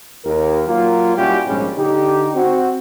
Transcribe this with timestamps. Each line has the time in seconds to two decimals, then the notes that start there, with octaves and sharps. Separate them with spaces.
0.25 D#2 A#4
0.68 F#3 A#3 F4
1.17 A#2 G3 C#4 E4 F#4 G4
1.47 A#1 G#2 G3 C#4
1.77 D3 D#4 G4
2.35 C4 F#4